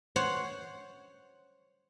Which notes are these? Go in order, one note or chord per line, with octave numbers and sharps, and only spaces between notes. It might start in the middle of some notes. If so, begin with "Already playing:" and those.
C5 C#5 F#5